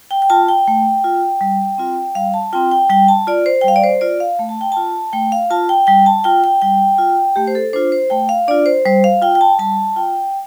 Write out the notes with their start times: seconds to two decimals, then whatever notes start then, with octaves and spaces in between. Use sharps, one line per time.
0.11 G5
0.22 G5
0.30 F4 A5
0.49 G5
0.68 A3
1.04 F4
1.41 G3
1.78 C4 F4
2.15 G3 F5
2.34 A5
2.53 C4 F4 G5
2.71 G5
2.89 G3 G5
3.08 A5
3.27 F4 D5
3.46 C5
3.61 G5
3.64 G3 F5
3.76 D5
3.84 C5
4.01 F4 D5
4.20 F5
4.39 A3
4.49 A5
4.61 G5
4.72 F4 A5
5.13 A3 G5
5.32 F5
5.50 F4 A5
5.69 G5
5.87 G3 G5
6.06 A5
6.24 F4 G5
6.44 G5
6.62 G3 G5
6.98 F4
7.36 A3 G4
7.48 C5
7.55 A4
7.73 D4 F4 C5
7.92 C5
8.10 A3 G5
8.29 F5
8.48 D4 F4 D5
8.66 C5
8.85 G3 C5
9.04 F5
9.22 F4 G5
9.35 G5
9.41 A5
9.59 G3 A5
9.96 F4 G5